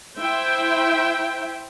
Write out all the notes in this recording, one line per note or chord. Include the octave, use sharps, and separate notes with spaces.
E4 C5 E5 G5